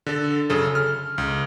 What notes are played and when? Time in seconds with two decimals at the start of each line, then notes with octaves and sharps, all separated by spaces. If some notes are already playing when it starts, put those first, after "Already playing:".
0.06 D3 A4
0.50 F#2 C#3 A4
0.75 F6
1.18 C#2